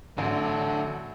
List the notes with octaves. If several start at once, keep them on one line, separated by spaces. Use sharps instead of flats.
A1 D3 F#3 A3 D4